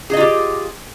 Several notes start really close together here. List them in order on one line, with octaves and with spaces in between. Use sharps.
G#4 D#5 F4 G4